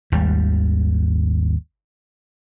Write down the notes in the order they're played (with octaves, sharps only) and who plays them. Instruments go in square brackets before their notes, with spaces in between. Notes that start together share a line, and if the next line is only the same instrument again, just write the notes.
[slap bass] G#1 D#2 G3